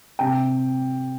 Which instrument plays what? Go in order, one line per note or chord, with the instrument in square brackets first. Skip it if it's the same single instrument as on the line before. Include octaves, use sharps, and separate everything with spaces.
[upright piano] C3 G5